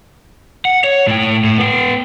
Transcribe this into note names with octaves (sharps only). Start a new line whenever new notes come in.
F#5
C#5
A2 G5
A2
B3 G5